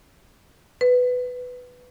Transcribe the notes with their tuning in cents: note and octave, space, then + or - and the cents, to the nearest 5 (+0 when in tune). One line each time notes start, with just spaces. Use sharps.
B4 +10